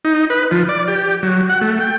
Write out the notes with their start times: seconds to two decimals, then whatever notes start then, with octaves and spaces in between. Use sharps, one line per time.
0.05 D#4
0.30 B4
0.51 F3
0.69 D5
0.88 G4
1.23 F#3
1.49 F#5
1.61 A3
1.80 G5